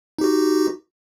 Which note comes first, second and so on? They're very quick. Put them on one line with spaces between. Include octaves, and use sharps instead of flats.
D#4 G4 F#4